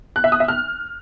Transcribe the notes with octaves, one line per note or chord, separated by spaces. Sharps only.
F#6
E5
D#6
E5
F6